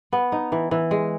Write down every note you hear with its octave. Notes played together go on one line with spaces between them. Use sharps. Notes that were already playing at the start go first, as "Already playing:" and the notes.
B3
D#4
E3
E3
G#3